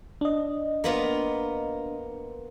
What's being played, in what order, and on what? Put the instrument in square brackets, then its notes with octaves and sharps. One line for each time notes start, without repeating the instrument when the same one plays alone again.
[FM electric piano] D4 D#5
[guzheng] A#3 B3 F4